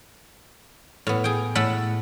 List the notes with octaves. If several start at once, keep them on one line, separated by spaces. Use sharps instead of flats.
A2 B3
G#4 G5
A2 A3 A4 F#5 B5